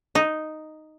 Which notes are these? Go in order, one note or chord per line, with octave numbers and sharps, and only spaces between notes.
D#4